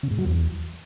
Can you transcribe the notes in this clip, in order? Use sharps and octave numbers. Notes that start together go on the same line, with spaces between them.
C#3
G#2
F#3
E2